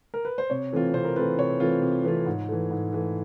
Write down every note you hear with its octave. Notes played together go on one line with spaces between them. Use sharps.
A#4
B4
C5
C3 C#5
E3 A3 C4 F4
C3 C5
A#4
E3 A3 C4 F4 B4
C3 C#5
E3 A3 C4 F4
C3
E3 A3 C4 F4
G#2
E3 A3
G#2
E3 A3